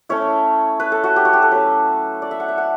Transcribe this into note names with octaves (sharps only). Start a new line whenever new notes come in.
A3 C#4 E4 C#5
B4
A4
F#4
G4
F#4
G4
A4
F#3 A3 C#4 B4
D5
E5
F#5
E5
F#5